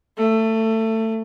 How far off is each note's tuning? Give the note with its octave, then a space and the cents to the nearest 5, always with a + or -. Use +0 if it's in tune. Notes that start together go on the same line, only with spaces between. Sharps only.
A3 +20